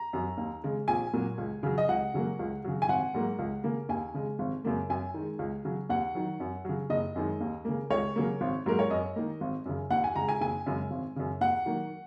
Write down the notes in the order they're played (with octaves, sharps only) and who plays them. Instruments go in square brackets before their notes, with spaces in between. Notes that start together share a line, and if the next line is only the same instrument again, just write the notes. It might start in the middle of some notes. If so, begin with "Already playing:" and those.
Already playing: [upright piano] A#5
F#2 F#3
D#2
C#3 G#3
A#1 G#5
A#2 F#3 A#3
C#2
C#3 F#3
D#5
C#2 F#5
C#3 F#3 A#3
C#2
C#3 F#3
G#5
G#1 F#5
G#2 F#3 A#3
C#2
C#3 A#3
D#2 G#5
C#3 G#3
G#1
F#2 C#3 A#3
F#2 G#5
D#3 G#3
C#2
C#3 F#3
D#2 F#5
D#3 F#3
F#2
C#3 F#3
F#1 D#5
F#2 D#3 G#3
D#2
C#3 A#3
C#2 C#5
C#3 F#3 A#3
G#1
G#2 F#3 A#3 A#4
C#5
F#2 D#5
D#3 A#3
G#1
F#2 C#3
D#2 F#5
G#5
C#3 G#3 A#5
G#5
F#1 G#5
F#2 C#3 G#3
G#1
F#2 C#3
D#2 F#5
D#3 F#3 A#3